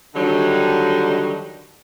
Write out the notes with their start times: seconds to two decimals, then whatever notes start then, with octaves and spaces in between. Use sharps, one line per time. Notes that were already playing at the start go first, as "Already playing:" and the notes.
0.16 D3 D#3 F#3 G3 D#4